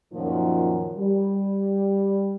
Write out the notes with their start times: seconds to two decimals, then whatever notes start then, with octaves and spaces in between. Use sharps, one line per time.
0.13 F#2 A#2 D#3 F3
0.96 G3